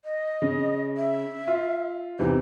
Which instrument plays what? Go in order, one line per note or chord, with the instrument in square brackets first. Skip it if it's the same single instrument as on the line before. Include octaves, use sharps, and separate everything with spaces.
[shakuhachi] D#5
[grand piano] C#3
[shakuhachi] E5
[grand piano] F4
[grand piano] E2 C3 E3 [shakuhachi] D#4